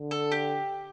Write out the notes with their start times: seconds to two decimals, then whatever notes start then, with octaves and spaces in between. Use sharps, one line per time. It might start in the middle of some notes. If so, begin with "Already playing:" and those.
Already playing: D3
0.11 A4
0.32 G4